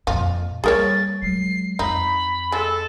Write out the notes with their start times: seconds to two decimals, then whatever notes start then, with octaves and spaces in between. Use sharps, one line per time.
0.07 F2 A#2 F4
0.64 G3 A#3 G#4 A#4 C#5 A6
1.22 F#3 G#3 C7
1.79 F2 D#4 B5
2.52 G#3 A4